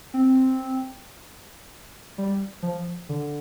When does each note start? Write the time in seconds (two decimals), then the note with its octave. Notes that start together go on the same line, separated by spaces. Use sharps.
0.14 C4
2.18 G3
2.63 F3
3.09 D3